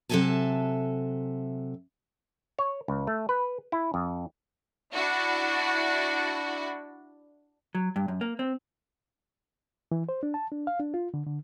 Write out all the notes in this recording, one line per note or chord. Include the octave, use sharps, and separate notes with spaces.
C3 F#3 A4 E5 G#5 A5
C#5
C#2
A3
B4
E4
F2
D4 E4 F#4
F#3
G2
F#2
A#3
C4
E3
C5
D4
A5
D4
F5
D4
F4
D3
D3